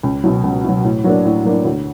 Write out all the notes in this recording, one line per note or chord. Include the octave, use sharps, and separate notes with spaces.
C#2
B2 F#3
C#2
B2 F#3
A2
F#3 A#3 D4
A2
F#3 A#3 D4
D2